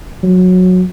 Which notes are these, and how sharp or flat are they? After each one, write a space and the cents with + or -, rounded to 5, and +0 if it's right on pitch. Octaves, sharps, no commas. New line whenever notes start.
F#3 -15